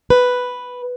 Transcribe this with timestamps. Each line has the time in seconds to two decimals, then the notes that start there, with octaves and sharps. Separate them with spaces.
0.10 B4